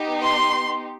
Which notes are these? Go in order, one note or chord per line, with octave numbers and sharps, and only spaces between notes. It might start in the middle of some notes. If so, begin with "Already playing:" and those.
Already playing: B3 D#4 G4
C6